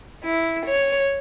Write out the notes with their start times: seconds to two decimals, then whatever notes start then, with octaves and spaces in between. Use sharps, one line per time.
0.24 E4
0.66 C#5